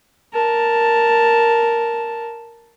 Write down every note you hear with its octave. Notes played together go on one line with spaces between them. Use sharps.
A#4 A5